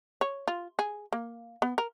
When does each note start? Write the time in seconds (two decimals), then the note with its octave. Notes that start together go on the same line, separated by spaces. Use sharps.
0.21 C#5
0.48 F4
0.79 G#4
1.13 A#3
1.62 B3
1.78 A#4